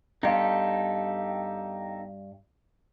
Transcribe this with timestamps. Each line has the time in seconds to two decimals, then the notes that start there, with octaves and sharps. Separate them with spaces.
0.23 G2 B3 D#4 G4 A4 F5